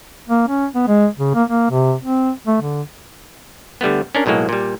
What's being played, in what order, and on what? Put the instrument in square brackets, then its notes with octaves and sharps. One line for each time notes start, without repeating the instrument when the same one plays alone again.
[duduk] A#3
C#4
B3
G#3
C#3
A#3
A#3
C3
C4
A3
D3
[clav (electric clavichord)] D3 G3 A3 B3
C#4 D4 A#4
B1 A2 F#3 G#3 A#3
A#2 G3